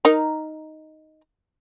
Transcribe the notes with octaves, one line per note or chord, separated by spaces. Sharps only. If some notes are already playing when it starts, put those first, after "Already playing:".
D#4 A#4